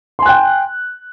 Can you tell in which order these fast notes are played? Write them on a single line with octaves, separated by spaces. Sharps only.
C6 G#5 F#6 G5